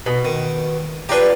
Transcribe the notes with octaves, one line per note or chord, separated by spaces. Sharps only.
B2
D#3
D4 F4 G4 B4 A#5